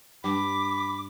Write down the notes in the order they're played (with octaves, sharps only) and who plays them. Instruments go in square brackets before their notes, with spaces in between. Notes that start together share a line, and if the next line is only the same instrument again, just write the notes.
[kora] G2 [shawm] B5 [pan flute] D6